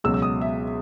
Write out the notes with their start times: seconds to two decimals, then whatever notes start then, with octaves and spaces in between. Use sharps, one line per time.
0.04 C#2 B2 F#3 E6
0.14 E6
0.22 D#6
0.41 E5